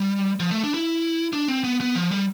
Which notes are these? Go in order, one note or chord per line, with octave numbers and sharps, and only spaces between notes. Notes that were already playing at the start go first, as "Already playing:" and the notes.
Already playing: G3
F3
A3
D4
E4
D4
C4
B3
B3
F3
G3